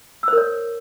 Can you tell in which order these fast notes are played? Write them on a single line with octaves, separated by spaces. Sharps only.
E6 C5 A#4 C#5